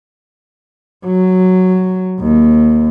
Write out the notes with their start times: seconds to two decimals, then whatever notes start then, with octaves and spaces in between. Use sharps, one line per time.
1.05 F#3
2.20 D#2